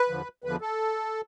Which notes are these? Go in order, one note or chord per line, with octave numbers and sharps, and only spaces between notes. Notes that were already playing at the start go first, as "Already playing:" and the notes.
Already playing: B4
E2 D3 F3
E2 D3 F3 B4
A4